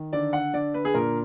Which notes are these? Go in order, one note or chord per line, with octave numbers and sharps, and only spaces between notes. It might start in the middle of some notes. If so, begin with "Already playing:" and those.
Already playing: D#3
D3 D5
F#5
D3 D5
B4
G#4
A#2 A#4